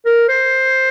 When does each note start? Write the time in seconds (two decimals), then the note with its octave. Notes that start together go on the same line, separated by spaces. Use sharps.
0.06 A#4
0.28 C5